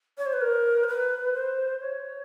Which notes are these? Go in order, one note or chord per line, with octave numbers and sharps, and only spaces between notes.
C#5
C5
B4
A#4
C5
B4
C5
C#5